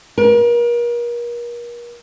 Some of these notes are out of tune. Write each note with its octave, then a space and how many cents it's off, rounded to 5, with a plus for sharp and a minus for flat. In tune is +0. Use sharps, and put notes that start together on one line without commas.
A#4 +35